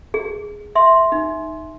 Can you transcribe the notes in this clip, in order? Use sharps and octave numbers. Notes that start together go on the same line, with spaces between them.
G#4
E5 C6
D#4